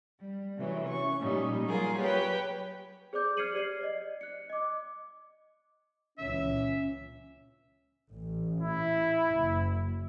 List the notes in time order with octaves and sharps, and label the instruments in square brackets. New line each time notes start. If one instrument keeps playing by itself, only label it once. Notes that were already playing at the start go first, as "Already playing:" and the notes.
[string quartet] G3
C3 E3 F#3
C#4 C#6
A#2 F3 G3 C#4 D#4
F#3 G3 A#3 F4 G#4 A#4
G4 B4 C#5 G5
[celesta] G#4 C5 D5 D6 G6
F6 G#6 C7 C#7 D#7 F#7
G4 C5 D5 C7
D5 D#5
F#6 C#7
D#5 D6
[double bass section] C#2 A#2 E3 [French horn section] C#4 [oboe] E5
[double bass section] A1
[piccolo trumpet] E4
[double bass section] F#1